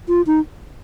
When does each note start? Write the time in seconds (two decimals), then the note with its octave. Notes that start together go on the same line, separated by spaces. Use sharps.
0.08 F4
0.27 D#4